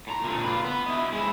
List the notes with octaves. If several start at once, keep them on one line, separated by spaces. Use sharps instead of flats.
A2 A#5
A#2 D3
F4 B4
B3
E4 D#5
G#3 E4